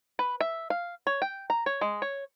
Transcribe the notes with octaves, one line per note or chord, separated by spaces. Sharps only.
B4
E5
F5
C#5
G5
A#5
C#5
G#3
C#5